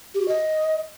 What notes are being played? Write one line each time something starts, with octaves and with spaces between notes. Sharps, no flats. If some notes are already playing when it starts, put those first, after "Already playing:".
G4
F#4
D#5